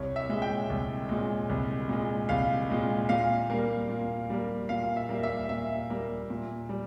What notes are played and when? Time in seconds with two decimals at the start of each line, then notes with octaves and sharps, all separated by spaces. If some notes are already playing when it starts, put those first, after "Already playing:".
Already playing: C2 C#5
0.16 E5
0.29 A#2 G#3
0.42 G5
0.70 C2
1.09 A#2 G#3
1.49 C2
1.89 A#2 G#3
2.29 C2 F5
2.70 A#2 G#3
3.09 A#2 F5
3.50 G3 A#3
3.89 A#2
4.30 G3 A#3
4.69 A#2 F5
4.96 E5
5.09 G3 A#3
5.23 E5
5.49 A#2 E5
5.90 G3 A#3
6.30 A#2
6.69 G3